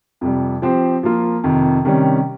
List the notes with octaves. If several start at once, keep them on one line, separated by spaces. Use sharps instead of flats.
F2 C3 G3
F3 C4 G4 C5
F3 A#3 F4
F2 C3 D#3
C3 D#3 G3 C#4